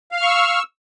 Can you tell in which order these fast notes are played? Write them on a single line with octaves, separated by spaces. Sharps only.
F5 F6 C#6 E6